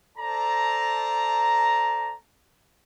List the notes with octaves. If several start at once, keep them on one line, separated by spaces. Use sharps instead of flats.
A4 C5 D5 A5 A#5